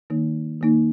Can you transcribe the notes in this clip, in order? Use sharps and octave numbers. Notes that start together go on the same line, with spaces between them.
D#3 A#3 D#4
D#3 A#3 D#4